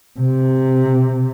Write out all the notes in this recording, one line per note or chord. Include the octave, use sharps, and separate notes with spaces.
C3